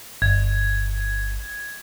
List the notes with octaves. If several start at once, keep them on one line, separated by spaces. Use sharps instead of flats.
G1 G#6